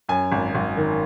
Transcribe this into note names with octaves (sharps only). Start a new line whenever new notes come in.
F#2 G#5
G#1
G#1
D#3